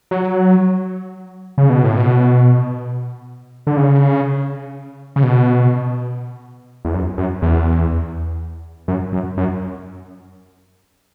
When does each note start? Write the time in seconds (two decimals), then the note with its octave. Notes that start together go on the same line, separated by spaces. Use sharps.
0.11 F#3
1.58 C#3
1.70 B2
1.84 A2
1.96 B2
3.67 D3
3.77 C#3
5.16 C#3
5.23 B2
6.85 E2
6.94 F#2
7.18 F#2
7.42 E2
8.88 F#2
9.13 F#2
9.37 F#2